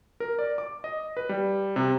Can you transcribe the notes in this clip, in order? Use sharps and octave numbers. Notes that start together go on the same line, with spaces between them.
A#4
D5
D6
D#5
B4
G3
C3